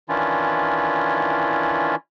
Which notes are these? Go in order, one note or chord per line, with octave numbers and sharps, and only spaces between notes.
D#3 E3 C#4 D4 E4 F4